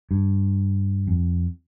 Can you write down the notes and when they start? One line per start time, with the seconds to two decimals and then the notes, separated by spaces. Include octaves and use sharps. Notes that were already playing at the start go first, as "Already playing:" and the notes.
0.11 G2
1.07 F2